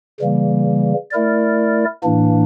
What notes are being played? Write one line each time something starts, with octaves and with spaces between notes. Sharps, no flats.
C#3 E3 G3 A#3
A3 E4 A#4 D5
A2 E3 A#3 D4